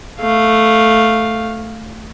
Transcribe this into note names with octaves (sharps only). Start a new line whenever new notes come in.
A3 F5